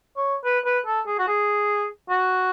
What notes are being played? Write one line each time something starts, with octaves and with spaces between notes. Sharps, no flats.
C#5
B4
B4
A4
G#4
F#4
G#4
F#4